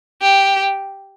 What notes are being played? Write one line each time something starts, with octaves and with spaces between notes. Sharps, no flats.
G4